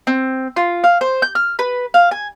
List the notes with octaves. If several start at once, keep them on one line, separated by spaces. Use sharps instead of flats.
C4
F4
F5
C5
G6
F6
B4
F5
G#5